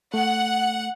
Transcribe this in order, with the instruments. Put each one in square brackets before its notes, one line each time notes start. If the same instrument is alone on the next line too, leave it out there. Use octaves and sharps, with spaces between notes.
[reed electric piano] A3 [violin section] F#5